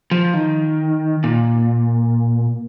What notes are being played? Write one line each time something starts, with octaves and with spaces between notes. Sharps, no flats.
F3
D#3
A#2